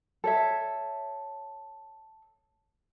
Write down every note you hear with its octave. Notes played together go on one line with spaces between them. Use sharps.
A4 C#5 E5